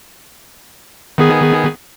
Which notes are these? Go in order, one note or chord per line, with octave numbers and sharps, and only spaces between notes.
D#3 B3 G#4